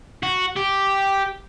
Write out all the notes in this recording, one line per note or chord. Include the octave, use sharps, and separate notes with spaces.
F#4
G4